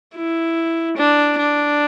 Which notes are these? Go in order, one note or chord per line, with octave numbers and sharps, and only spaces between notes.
E4
D4
D4